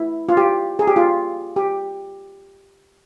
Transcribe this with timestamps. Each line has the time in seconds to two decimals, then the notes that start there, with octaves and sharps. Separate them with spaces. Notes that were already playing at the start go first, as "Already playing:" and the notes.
Already playing: E4
0.29 F4
0.37 G4
0.79 G#4
0.87 G4
0.96 F4
1.56 G4